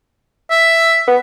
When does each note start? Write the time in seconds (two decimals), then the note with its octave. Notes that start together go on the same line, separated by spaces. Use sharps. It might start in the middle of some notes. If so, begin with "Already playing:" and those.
0.51 E5
1.07 B3